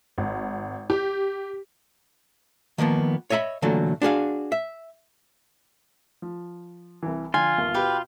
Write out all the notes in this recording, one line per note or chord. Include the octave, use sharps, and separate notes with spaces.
G#1
G4
D#3 F3 A#3 B3
C#5 D#5 E5 A#5 B5
A#2 D3 E3 F#3 A3
D4 F#4 G#4 F5
E5
F3
C2 E3
D3 F3 F4 G#5
G1 D#2
B2 G4 B4 F5